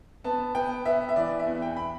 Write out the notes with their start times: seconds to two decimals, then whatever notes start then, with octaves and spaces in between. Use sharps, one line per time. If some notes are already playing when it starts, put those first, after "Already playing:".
0.24 B3 A5
0.55 B3 G5
0.85 B3 E5
1.09 E5
1.16 E3 D5
1.39 E5
1.47 E2
1.62 G5
1.77 B5